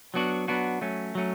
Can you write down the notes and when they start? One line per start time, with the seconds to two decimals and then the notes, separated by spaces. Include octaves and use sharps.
0.14 F#3 B3 D4 F#4
0.48 F#3 B3 D4 F#4
0.81 F#3 A3 C#4
1.15 F#3 A3 C#4